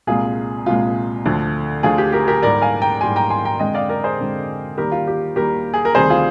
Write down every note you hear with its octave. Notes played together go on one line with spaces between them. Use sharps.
C2 A#2 G#3 F4 G#4
C2 A#2 G#3 F4
D2 D3 F3
D2 D3 F3 F4 G#4
G4
G4 A#4
G4 A#4
G#2 G3 A#3 A#4 D5
F5 G#5
G5 A#5
G#2 G3 A#3 G#5 C6
G5 A#5
G#5 C6
G5 A#5
F2 D3 G#3 D#5 G5
D5 F5
A#4 D5
G#4 C5
F2 D3 G#3
D#2 D#3 G3 G4 A#4
F4
G4
D#2 D#3 G3 G4 A#4
G#4
A#4
D2 C3 D#3 G3 G#4 C5
F4 G#4